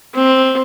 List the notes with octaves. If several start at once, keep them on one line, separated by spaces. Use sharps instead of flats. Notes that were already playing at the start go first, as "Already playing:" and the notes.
C4